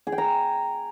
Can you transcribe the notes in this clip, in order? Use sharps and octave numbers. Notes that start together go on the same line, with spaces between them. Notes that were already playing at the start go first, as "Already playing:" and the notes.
G#4
G5
A#5